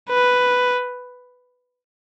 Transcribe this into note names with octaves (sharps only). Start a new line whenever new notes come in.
B4